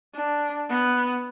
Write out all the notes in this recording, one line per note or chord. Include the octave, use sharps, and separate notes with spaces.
D4
B3